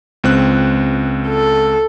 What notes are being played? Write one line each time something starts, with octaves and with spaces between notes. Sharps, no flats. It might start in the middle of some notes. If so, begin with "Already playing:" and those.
C#2 C4 F#6
A4